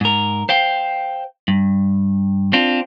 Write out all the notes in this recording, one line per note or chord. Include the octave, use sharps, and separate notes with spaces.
G#2 A#4
C5 F5 G5
G2
C4 D4 F4